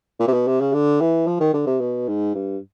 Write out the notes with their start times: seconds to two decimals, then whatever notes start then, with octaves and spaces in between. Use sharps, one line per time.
0.20 A#2
0.28 C3
0.33 B2
0.47 C3
0.60 C#3
0.73 D3
1.01 E3
1.27 F3
1.40 D#3
1.54 D3
1.67 C3
1.80 B2
2.08 G#2
2.35 G2